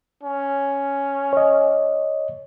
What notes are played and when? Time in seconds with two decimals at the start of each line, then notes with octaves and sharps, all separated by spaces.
0.23 C#4
1.33 C#5 D#5